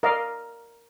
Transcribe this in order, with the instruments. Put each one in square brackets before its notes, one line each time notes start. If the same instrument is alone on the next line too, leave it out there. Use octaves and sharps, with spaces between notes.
[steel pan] A#4 D5 D#5 F5